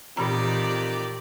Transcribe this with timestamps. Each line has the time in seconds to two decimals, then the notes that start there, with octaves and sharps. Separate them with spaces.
0.17 F2 A#2 D#3 E3 G4 D5 A#5